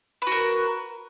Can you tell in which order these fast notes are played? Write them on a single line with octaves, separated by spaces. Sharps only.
B4 F#4 A#4